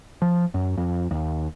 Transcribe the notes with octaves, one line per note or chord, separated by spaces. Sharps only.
F3
F#2
F2
D#2